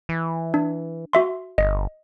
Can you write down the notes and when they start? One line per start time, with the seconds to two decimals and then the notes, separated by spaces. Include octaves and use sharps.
0.09 E3
0.54 D4
1.13 F#4 E5 C6
1.58 G1 D#5